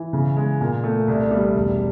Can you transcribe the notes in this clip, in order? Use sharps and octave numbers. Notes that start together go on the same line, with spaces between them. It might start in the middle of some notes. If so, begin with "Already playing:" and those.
Already playing: E3
C#3
G#3
A#2
A3
C2
G3
E1